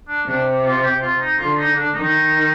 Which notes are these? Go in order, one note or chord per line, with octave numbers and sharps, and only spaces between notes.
D4
C3 D4
F4
G4
F4
D#4
D3 F4
D#4
D4
D#3 D#4